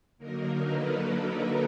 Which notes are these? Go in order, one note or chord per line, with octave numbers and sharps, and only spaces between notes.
D3 F#3 A#3 D#4 A#4
A4 B4